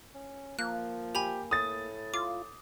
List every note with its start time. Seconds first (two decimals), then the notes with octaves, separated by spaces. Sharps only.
0.15 C#4
0.59 F3 A#3 F#6
1.15 G4 G#5 B5 F7
1.51 A2 D#6 A6
2.14 F4 D6